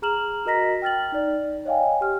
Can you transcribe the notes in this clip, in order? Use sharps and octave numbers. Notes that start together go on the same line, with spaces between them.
G#4 A#5 F6 E7 F#7
F#4 A#4 D#5 A#5 A#6 B6
G5 F6 A6 F#7
D#4 D5
C#5 D#5 F5 G5 G#5
G4 F6